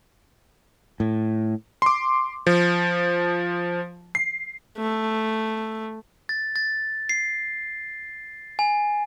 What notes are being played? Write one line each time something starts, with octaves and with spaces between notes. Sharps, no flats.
A2
C6 D6
F3
C7
A3
A6
A6
C7
G#5